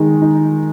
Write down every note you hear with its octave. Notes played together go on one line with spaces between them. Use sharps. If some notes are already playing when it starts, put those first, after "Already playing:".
Already playing: D#3 G#3
D#4